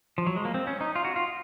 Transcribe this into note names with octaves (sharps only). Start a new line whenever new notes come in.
F3
F#3
G#3
A#3
C4
C#4
D#4
F4
F#4
F4